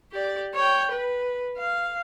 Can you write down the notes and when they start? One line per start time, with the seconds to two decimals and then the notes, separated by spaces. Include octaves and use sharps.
0.12 G4 D5
0.54 C#5 G5
0.92 B4
1.58 F5